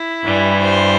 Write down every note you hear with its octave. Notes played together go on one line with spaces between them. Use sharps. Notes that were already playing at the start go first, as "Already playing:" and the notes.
Already playing: E4
G2 E3 G3
C5